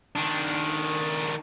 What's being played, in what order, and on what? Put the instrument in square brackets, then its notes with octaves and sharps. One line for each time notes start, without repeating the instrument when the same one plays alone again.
[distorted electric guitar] D#3 D4